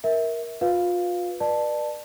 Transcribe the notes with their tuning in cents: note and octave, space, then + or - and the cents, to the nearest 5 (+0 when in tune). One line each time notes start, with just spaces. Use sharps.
A#4 +10 E5 -20
F4 +30 B4 +0 F5 +0
B4 -30 D5 +30 A5 +0